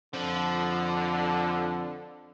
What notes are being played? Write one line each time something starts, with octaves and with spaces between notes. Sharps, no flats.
F2 D3 F3